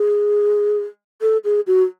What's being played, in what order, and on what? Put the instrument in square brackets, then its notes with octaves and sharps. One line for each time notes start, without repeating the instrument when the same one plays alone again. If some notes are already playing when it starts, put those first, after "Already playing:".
Already playing: [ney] G#4
A4
G#4
F#4